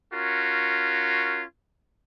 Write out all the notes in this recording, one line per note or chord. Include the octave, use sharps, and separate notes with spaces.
C#4 F4 F#4 A#4